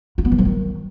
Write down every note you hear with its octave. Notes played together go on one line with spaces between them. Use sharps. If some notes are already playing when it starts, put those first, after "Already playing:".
F4
B3
E3
F3
D#3